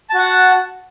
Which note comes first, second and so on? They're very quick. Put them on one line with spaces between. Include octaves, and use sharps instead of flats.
A5 F#4 F#5